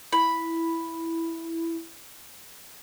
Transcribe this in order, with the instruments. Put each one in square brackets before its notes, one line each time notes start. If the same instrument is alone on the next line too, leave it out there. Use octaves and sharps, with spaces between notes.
[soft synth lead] E4 [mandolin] B5